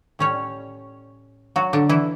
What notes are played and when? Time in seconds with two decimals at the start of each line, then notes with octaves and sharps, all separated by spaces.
0.19 A2 G3 C#4 C#5
1.56 F#3 F#4
1.73 D3 D4
1.89 E3 E4